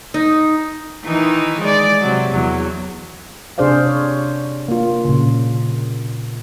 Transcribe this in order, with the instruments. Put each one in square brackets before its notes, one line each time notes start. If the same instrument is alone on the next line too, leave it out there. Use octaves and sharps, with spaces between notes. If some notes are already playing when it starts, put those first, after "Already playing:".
[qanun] D#4
[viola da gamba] D#3 E3 D#4
G#3 D5
C3 F#3
E2 F#3
[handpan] C3 D4 G#4 C5 D5 F5
C#5
A#3 F4
A#2 C#3